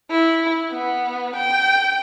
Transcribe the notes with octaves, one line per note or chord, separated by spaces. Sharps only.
E4
B3
G5